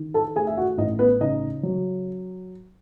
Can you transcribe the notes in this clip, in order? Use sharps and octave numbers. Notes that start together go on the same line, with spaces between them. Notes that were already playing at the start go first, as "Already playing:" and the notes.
Already playing: D#3
A4 A5
A3 G#4 G#5
E5
F#4 F#5
A1 D#4 D#5
B3 B4
C#3 D#4 D#5
F#3